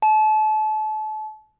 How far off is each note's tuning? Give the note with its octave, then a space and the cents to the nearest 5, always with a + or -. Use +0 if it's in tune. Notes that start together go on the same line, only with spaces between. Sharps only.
A5 -35